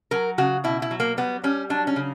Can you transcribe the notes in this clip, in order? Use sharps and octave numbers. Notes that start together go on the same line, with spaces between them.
F#3 A#4
C#3 F#4
B2 E4
E4
F#3
A#3
G3 B3
G3 C#4
F#3 D4
C#4
C#3